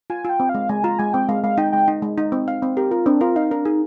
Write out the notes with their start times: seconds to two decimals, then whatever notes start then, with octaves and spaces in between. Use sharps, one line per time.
0.10 F4 G#5
0.25 F4 G5
0.40 C4
0.49 F5
0.55 G#3
0.69 G#3 G#5
0.84 F4 A#5
0.99 G#3 G#5
1.13 C4 G5
1.29 G#3 F5
1.43 G#3 F5
1.58 D#4 G5
1.72 G#3 G5
1.88 D#4
2.02 G#3
2.18 D#4
2.32 C4
2.48 F5
2.63 C4
2.77 G4 A#4
2.91 F4 A#4
3.06 C4 D4
3.21 F4 A#4
3.36 D#4 F5
3.51 D4 A#4
3.65 D#4 G#4